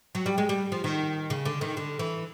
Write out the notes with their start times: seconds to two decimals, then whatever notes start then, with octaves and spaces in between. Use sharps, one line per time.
0.15 F#3
0.26 G3
0.38 G#3
0.49 G3
0.72 F3
0.84 D#3
1.30 C#3
1.45 D3
1.61 D#3
1.77 D3
1.99 E3